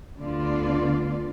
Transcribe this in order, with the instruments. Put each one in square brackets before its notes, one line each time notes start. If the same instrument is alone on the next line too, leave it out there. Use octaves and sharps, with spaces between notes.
[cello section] D2 D3 B3 F4 D5